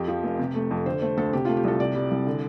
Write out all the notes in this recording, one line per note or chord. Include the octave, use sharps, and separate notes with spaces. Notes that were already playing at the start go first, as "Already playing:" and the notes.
Already playing: F2 G4
F3
F1
C3
A3
F2
D3 C5
A3 C5
D2 A4
C3 G4
A3 F4
G4
C2 A4
C3 D5
G3
C2
D3